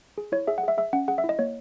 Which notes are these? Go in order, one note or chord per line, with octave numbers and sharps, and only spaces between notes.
G#4
E4 C#5
G#4 E5
F#5
G#4 E5
G#4 E5
C#4 F#5
G#4 F#5
E5
E4
D#5
A#3 C#5